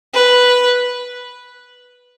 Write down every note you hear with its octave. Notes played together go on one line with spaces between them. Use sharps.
B4